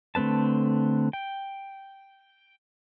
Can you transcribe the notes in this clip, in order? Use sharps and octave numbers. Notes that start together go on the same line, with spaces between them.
D3 A3 C4 B4 A5
G5